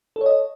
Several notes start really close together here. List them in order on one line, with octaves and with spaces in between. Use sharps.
A4 C#5 D#5